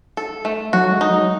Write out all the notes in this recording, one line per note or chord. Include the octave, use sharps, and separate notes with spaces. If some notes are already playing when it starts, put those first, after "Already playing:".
A4
A3
F#3 F#4
G#3
D#4
F#3